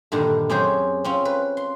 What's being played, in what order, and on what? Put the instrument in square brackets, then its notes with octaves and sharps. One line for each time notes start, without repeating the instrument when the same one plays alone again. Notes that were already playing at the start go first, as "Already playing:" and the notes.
[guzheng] G2 A#2 D3 D#3
F#2 C4 C#4 G4 G#4 C5
C4 C#4 F4
B4
C6